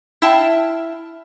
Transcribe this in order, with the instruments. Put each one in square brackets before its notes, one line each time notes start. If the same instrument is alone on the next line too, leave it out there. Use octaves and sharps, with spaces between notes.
[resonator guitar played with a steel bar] E4 E5 F5 G5 A5